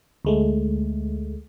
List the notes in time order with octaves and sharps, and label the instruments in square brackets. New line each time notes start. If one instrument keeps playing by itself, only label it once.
[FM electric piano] D2 G#3 A3